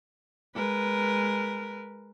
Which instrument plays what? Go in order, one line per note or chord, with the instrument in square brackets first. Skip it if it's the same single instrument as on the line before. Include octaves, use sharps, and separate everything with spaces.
[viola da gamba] G#3 A#4 B4